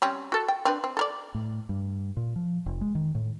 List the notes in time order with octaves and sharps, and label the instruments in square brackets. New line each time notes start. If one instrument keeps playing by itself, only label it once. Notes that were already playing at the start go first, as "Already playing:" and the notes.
[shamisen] G3 C4 C#4
F#4 A4
G5
C4 D4 B4
C4
A4 A#4 D5
[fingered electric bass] A2
G2
A#2
F3
F1
G#3
D#3
A2